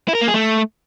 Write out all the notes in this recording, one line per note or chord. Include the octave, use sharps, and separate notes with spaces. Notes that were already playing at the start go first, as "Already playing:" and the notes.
E4
A#4
A#3
G#4
A3